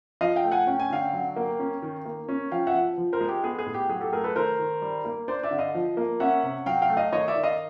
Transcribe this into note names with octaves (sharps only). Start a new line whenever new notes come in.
F3 D#5 F5
F5 G5
A3
F#5 G#5
C#4 G5
G#5
D3 F5 G5
F#3
A#3
C#4
D#3
A#3
C#4
F3 F5 G5
E5 F#5
F3
F3
A#4 C5
G#3
G4
B3 G#4
G#4
A2
G4
F#3 G#4
G4 A4
A3 G#4 A#4
A4 B4
D#3 A#4 C5
D#3
G3
A#3
D4 C5 D5
D5 E5
D3
D#5 F5
F3
A#3
C#4 E5 F#5
C3
F#3 F5 G5
F5 G5
A3
D#5 F5
D#3 C#5 D#5
D5 E5
D#3
D#5 F5